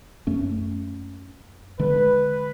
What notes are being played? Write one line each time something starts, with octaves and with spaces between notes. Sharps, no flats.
F#2 A3 C#4
D3 G#3 B4